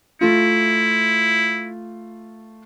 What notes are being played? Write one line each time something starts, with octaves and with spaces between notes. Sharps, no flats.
A3 E4 F4